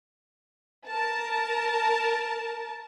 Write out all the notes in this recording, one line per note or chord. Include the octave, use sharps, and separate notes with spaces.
A#4 A5